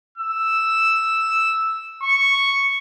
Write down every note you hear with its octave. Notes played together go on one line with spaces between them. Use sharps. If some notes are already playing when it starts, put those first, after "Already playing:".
E6
C#6